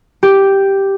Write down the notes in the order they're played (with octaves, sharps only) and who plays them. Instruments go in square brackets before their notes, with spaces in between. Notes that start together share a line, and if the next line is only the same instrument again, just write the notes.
[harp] G4